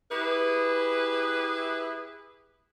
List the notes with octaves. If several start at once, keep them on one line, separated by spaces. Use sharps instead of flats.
E4 G4 G#4 B4